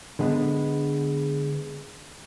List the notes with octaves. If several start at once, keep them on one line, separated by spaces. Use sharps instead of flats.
D3 G#3 B3